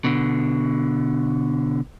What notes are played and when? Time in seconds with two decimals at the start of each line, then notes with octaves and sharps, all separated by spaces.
0.04 B2 D3